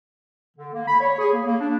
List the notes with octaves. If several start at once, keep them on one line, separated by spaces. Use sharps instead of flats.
D3
A#3
B5
C#5
G#4
A#3
A#3
D4